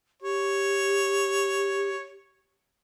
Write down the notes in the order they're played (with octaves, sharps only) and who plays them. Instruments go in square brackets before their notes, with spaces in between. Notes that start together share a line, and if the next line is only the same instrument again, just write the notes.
[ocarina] G4 [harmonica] C#5